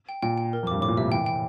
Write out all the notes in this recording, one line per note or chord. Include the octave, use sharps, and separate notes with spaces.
G5
A#2 G5
G5
A#4
F2
G2 D6
A2 D6
A#2
C3 E5
E3 G5
G5